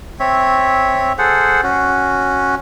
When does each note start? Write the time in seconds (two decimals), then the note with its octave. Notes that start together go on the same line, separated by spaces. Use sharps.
0.20 C4 C#5 E5
1.18 G#4 A4 C5 F#5
1.63 C#4 F#4